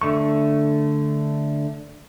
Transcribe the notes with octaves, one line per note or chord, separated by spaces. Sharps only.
D3 A3 C#6